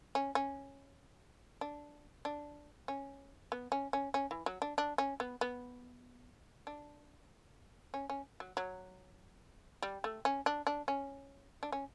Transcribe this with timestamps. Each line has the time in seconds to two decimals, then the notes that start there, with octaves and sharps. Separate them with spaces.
0.15 C#4
0.35 C#4
1.61 D4
2.25 D4
2.88 C#4
3.52 B3
3.72 C#4
3.93 C#4
4.14 C#4
4.31 E3
4.46 F#3
4.62 D4
4.78 D4
4.98 C#4
5.20 B3
5.41 B3
6.67 D4
7.94 C#4
8.10 C#4
8.40 F#3
8.57 F#3
9.82 G3
10.04 A3
10.25 C#4
10.46 D4
10.67 D4
10.88 C#4
11.63 D4
11.72 C#4